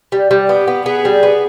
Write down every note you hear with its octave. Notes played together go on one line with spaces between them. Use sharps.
G3
G3
B3 G4
B3
B3 G#4
G3
B3